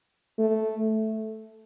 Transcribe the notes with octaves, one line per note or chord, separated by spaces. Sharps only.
A3